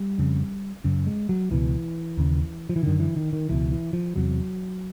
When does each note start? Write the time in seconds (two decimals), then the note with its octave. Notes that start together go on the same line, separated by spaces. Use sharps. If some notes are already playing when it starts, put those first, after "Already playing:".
Already playing: G3
0.18 F2 C#3
0.84 F#2 C#3
1.07 G#3
1.29 F#3
1.51 C#2 B2 E3
2.17 D#2 C#3
2.69 F3
2.76 E3
2.83 F#2 D3 D#3
3.00 E3
3.16 D#3
3.33 D#3
3.49 C#2 B2 E3
3.72 E3
3.93 F3
4.16 E2 C3 F#3